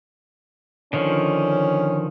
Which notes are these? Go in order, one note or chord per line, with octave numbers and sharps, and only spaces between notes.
D3 D#3 F3 C#4